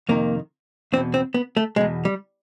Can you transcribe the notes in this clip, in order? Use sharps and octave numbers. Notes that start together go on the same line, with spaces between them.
F2 C3 D#3 A#3
E2 B2 C4
C4
B3
A3
E2 B2 G#3
G3